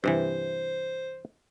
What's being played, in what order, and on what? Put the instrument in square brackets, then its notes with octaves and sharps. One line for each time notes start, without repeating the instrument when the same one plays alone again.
[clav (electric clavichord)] G2 C3 E3 [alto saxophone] C5